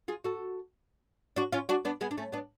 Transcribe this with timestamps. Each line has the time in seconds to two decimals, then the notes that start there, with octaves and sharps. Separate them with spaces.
0.08 F4 G#4
0.24 F#4 A4
1.36 D4 F#4
1.52 C#4 F4
1.69 D4 F#4
1.85 B3 D4
2.01 G#3 B3
2.11 D4
2.18 A3 C#4
2.32 B3 D4